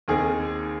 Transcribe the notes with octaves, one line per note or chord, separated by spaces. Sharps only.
D#2 D#3 C4 G#4